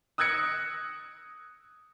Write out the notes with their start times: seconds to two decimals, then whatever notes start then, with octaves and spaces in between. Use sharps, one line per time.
0.18 D#6 E6 F#6 G#6 A#6 C#7